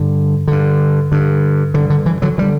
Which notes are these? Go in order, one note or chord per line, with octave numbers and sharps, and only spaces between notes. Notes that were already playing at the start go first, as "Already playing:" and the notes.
Already playing: G2 D3
G2 D3
G2 D3
G2 D3 E3
D3
E3
D3 F#3
D3 E3 G3